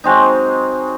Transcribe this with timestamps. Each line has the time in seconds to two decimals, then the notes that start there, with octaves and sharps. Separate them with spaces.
0.04 F#3 G#3 C4 D#4